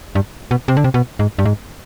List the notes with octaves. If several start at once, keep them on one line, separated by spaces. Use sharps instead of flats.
G2
B2
C3
D3
C3
B2
G#2
G2
G#2